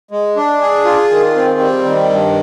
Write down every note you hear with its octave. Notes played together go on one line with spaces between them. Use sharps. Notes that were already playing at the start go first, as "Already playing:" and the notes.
G#3
D4
G#4
F4
D#3
C4
G3
D#3
G2